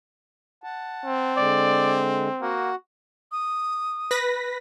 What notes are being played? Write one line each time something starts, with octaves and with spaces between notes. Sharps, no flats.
F#5 A5
C4
D3 G#3 D5
A#3 F#4 F#5
D#6
B4 A#6 B6